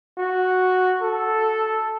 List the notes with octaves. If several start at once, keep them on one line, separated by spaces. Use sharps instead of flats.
F#4
A4